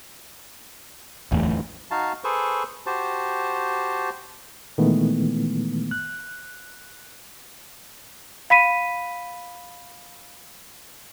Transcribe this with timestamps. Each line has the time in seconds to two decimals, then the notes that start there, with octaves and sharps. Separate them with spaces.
1.32 D1 A1 E2
1.91 D#4 F#4 F5 A5
2.24 G#4 A4 B4 C5 C#6
2.86 F#4 G4 C5 A5
4.78 A#2 D#3 E3 G#3 A3 B3
5.91 F#6
8.50 F5 B5 B6 D#7